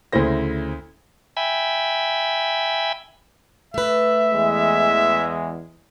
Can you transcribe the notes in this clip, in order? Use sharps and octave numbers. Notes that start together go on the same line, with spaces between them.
D2 C#3 E4 C5 A#6
E5 G5 G#5 B5
A3 B4 E5
E2 E3 G#3